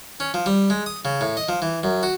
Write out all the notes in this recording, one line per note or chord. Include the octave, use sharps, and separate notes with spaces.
C#4
F3
G3
G#3
D#6
C#3
A2
D#5
F3
E3
F#2
F#4